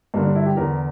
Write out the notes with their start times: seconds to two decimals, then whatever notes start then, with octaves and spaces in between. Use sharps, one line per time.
0.14 G2 D3 A#3
0.24 D4
0.35 E4
0.46 G4
0.57 E2 D3 A#4